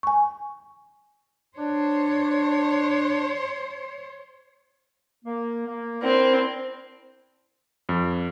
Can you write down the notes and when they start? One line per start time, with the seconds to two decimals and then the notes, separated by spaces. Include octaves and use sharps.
0.03 G#5 C#6
1.57 D4 C5 C#5
5.25 A#3
5.66 A#3
6.01 C4 D4 E4 A#4
7.89 F2